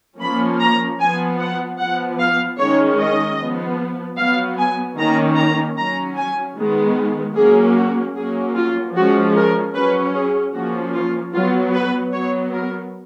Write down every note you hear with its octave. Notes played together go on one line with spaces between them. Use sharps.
F3 A#3 C#4 B5
A#5
F3 B3 G#5
F#5
F3 B3 F#5
F5
D#3 G#3 C#4 C#5
D#5
F3 B3
F#3 B3 F5
G#5
D#3 A#3 C#4 A#5
A#5
F#3 C#4 A#5
G#5
D#3 G#3 B3
F#3 A#3 C#4 G#4
F#4
F#3 A#3 C#4 G#4
F4
F3 G#3 C#4 F#4
A#4
F#3 C#4 B4
G#4
F3 A#3 C#4 F#4
F4
F#3 B3 F4
B4
F#3 B3 C#5
A#4